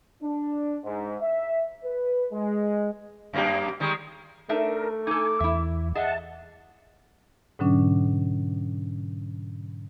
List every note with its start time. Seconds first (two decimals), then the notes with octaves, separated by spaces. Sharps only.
0.23 D4
0.84 G#2
1.21 E5
1.84 B4
2.32 G#3
3.33 F#2 A#3 G4
3.80 D#3 G3 G#3
4.49 A3 D4 D#4 A#4 E5
5.07 D#4 A4 G#5 D6
5.40 E2 E4 E5
5.95 G#4 D#5 E5 F#5 A5
7.59 G#2 B2 D3 F#3 C#4 D4